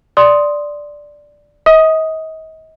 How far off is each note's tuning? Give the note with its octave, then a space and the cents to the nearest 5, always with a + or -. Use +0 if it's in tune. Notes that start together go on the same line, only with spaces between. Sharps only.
D5 +0 C6 +0 D#6 +0
D#5 +40 D#6 +0